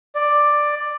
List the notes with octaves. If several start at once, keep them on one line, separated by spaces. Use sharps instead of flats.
D5